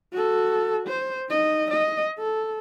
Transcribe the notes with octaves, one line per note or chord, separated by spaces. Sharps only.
F#4 A4
C5
D#4 D#5
D#5
A4